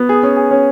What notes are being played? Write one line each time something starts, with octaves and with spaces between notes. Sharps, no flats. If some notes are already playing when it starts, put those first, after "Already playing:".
Already playing: B3
G#4
C#4
G#4
C#4